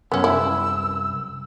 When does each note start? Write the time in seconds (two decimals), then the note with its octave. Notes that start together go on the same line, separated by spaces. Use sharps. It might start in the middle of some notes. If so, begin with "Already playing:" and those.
0.12 C2 F#2 B3 C#4 E6
0.24 E4